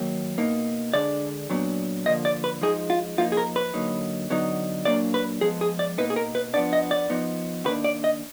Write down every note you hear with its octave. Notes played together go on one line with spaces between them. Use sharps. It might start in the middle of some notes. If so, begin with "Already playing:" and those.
Already playing: D#3 F#3 A#3
B2 A#3 D#4
D3 G#3 D4 D5
A#2 F#3 B3 D4
D3 F3 A#3 D#5
D5
B4
F3 G#3 D#4 G#4
F4
F3 A#3 D#4 F4
G#4
A#4
B4
D3 F#3 A#3 D#4
D3 F#3 B3 D#4
A#2 F#3 A#3 D4 D5
B4
F3 G#3 B3 G#4
G#4
D5
B2 A#3 D#4 B4
G#4
A#4
B4
F3 B3 D4 D5
D#5
D5
F3 B3 D#4
D#3 A#3 D4 B4
D5
D#5